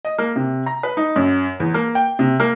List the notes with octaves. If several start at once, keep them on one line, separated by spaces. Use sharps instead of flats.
D#5
A#3
C3
A#5
B4
D#4
F#2
E2
A#3
G5
C3
A#3